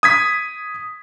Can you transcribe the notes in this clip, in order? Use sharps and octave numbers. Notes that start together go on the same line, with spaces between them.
D#6 G#6 B6